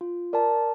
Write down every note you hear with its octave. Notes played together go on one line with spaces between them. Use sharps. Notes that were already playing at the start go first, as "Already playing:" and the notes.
F4
A#4 D5 A5